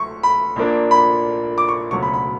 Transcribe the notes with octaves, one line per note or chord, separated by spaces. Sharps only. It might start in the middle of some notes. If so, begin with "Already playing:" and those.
Already playing: D2 F#3 C#6
B5
A#1 A#2 A#3 D4
B5
D6
C#6
E1 D2 C#3 F#3 C#6
B5
B5